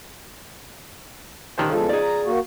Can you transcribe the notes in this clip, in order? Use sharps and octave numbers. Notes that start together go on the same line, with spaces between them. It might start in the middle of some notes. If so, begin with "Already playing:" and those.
D3 D#3 D4 C5
E2 C#3 F3 G#3 A4
D#4 G#4 D5
A#5
A#3 F#4